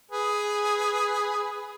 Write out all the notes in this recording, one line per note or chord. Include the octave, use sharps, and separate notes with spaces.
G#4 B4